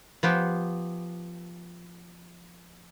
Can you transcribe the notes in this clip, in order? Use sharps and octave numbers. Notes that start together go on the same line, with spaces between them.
F3 B3 G4